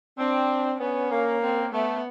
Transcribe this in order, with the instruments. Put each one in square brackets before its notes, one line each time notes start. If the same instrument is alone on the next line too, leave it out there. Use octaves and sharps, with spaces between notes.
[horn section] C4 [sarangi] D4
[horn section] B3 [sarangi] C#4
[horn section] A#3
[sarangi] C4
[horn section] A3 [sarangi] B3